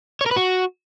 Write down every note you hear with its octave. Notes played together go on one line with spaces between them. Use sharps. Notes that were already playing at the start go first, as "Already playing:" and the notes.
C#5
A#4
B4
F#4